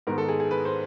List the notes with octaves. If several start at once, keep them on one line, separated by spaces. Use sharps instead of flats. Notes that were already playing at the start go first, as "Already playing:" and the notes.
G#2 D#3 G#3 B3 A#4
A4
G#4
G#4
B4
C5